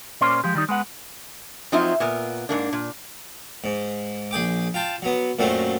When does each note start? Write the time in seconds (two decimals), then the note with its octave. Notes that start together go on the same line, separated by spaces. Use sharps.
0.21 A#2 A#3 C#4 C5 D5 C6
0.44 F3 G#3 G4
0.55 D#3 G3 D#4
0.69 G#3 B3 F#5
1.72 F3 F#3 C4 D#4 F4 E5
2.00 A#2 B3 A#4
2.49 G#2 A#3 D4
2.73 A#2
3.64 G#2
4.31 A#1 G#4 G5 D6
4.74 F4 G5 A5
5.02 F#3 B3
5.39 F#2 A#2 F#3 A3 C4